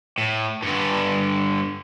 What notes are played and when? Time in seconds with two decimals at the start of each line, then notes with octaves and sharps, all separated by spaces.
0.18 A2
0.62 G2 D3